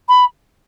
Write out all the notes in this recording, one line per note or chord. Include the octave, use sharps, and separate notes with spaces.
B5